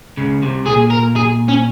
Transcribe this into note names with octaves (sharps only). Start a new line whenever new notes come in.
C#2 C#3
C2 C3
A#2 G#4
A#4
G#4
C#4